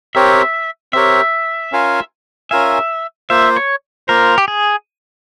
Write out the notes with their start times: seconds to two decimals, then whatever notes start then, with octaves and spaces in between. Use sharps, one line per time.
0.15 C4 G4 A#4 C#5 E5
0.93 C4 G4 A#4 C#5 E5
1.72 C#4 F4 A#4 F5 G#5
2.51 C#4 F4 A#4 E5 F5 G#5
3.30 A#3 F4 C5 E5
3.56 C#5
4.08 A#3 F4 A#4 C5
4.38 G4
4.48 G#4